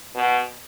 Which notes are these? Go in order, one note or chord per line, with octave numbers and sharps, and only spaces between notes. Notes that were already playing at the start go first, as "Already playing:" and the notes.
B2